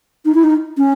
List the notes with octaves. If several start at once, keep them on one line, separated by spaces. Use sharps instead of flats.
D#4
E4
D#4
C#4